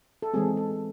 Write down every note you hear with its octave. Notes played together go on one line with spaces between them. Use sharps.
A4
E3 G#3 C4 G#4
A4